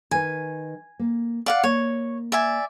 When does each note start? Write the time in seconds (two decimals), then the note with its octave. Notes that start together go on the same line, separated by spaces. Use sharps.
0.11 D#3 B4 G#5
0.99 A#3
1.46 D5 F5 F#5
1.64 A#3 C#5
2.32 D5 E5 G#5